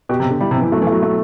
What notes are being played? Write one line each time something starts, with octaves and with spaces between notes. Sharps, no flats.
B2 G4
C3
B2
D3
G3 E4
C3
B2 E3
F#3 A3
E3
A3
F#3
A3